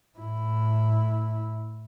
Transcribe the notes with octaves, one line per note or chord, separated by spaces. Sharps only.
A2 E4